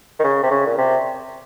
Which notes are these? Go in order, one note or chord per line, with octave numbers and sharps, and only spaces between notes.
D#3
C#3
C3
C#3
A#2
C3